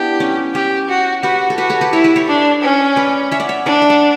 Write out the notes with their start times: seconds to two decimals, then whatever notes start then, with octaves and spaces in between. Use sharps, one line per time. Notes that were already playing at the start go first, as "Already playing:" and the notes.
Already playing: B3 D4 E4 G4
0.20 C#4
0.54 C#4 G4
0.89 F#4
1.23 F#4 G4 B4
1.50 A4
1.58 F#4 G4 B4
1.70 A4 C#5
1.81 G4 B4
1.93 E4 A4 C#5
2.04 G4 B4
2.16 A4 C#5
2.28 D4
2.62 C#4
2.96 B4 D5
3.31 C#5 E5
3.40 D5 F#5
3.49 C#5 E5
3.66 D4 B4 D5
3.82 E5
3.89 D5 F#5